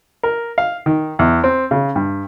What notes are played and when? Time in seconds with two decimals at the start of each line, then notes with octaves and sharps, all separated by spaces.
0.23 A#4
0.58 F5
0.86 D#3
1.19 E2
1.44 C4
1.71 C#3
1.96 G2